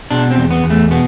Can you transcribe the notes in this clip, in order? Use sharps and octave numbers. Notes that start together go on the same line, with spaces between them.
B2 D4
C4
E2
B3
E2
A3
B2 B3